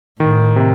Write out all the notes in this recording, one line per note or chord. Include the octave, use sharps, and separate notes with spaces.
A2 D#3
C3